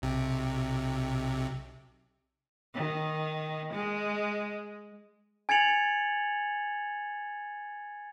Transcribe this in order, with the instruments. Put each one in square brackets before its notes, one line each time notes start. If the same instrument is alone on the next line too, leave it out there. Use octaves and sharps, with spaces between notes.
[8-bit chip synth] B1 C3
[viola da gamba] D#3
G#3
[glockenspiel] G#5 G#6 A6 C#7 F7 F#7